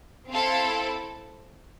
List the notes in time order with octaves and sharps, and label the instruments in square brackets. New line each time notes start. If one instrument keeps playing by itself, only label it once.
[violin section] C4 E4 A4 F5